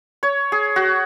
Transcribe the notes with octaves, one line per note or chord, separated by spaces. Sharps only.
C#5
G#4
F#4